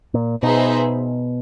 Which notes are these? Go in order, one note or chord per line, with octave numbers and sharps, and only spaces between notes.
A#2
B2 B3 D#4 G#4 C5 E5